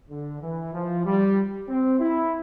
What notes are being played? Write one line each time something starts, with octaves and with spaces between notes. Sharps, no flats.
D3
E3
F3
G3
C4
E4